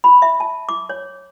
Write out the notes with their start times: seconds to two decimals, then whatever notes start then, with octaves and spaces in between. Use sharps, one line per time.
0.04 B5
0.22 E5
0.40 A5
0.69 D6
0.89 C#5